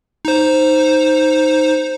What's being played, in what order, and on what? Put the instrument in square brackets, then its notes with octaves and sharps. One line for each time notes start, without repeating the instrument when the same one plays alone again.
[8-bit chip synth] D#4 C5